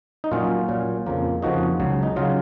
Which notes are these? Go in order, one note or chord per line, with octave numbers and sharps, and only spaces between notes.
D#4
A#2 F#3 C#4 F4
A#2 F#3 C#4
F2 C#3 F3 A#3
F2 C#3 F3 A#3 D#4 F#4
C#2 C#3 F#3
D#4
C#3 F#3 F4